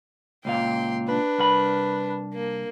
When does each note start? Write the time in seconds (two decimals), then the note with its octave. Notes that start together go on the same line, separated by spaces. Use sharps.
0.45 C#2 A#2 F5 G5 C6
1.08 D4 B4
1.38 C2 A#4 B5
2.34 A#3